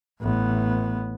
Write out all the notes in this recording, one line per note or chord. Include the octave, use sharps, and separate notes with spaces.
A1 B3